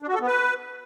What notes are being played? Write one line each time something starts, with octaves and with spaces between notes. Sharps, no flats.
D4
F#4
A4
B3
B4